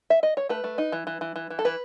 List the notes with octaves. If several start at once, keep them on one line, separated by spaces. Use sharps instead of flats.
E5
D#5
C#5
A3 B4
A3
D#4
E3
E3
E3
E3
E3
A4
E3 B4